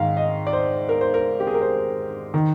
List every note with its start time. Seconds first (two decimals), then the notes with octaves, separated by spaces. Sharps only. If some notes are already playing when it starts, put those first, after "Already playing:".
Already playing: G#2 D#3 F5
0.17 D#5
0.47 D5
0.53 C5
0.89 A#4
1.01 C5
1.14 A#4
1.40 G4
1.47 G#4
1.54 A#4
1.61 C5
2.34 D#3